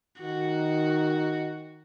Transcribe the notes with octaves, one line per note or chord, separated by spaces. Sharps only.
D#3 F#4